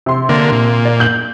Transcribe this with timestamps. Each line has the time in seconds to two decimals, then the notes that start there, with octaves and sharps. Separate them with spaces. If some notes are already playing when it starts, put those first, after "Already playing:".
0.06 C3 C6
0.29 D3 A#3
0.52 A#2
0.85 D5
1.00 G6 F#7